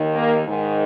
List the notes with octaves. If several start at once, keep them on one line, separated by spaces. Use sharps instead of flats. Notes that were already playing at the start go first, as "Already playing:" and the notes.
Already playing: D#2 D#3
A#3
G#2 D#3